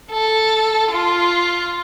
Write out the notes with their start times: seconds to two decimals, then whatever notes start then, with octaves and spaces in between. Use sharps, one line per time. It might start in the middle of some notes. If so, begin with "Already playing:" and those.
0.11 A4
0.92 F4